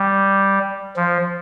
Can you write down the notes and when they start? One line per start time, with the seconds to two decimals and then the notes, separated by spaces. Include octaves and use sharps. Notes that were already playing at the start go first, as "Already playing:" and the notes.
Already playing: G3
0.96 F3